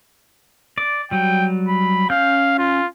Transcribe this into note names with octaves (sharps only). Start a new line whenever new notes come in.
D5
F#3 G3 G5
B5
C#4 F5 G6
F4